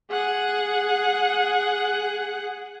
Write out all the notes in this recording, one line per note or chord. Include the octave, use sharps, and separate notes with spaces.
G#4 F#5